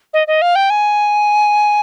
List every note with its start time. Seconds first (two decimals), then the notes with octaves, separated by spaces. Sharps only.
0.14 D#5
0.27 D#5
0.42 F5
0.55 G5
0.70 G#5